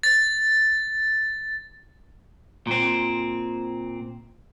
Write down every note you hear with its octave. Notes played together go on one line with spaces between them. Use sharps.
A6
A#2 C4